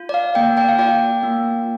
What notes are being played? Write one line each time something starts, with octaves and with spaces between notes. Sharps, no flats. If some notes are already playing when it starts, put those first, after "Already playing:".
Already playing: F4
D5
F5
A#3 D5 G5
D5 G5
F5
F4 D5 G5
A#3